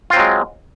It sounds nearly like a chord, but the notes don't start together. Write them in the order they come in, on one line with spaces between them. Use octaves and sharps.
F4 C4 F#3 G#3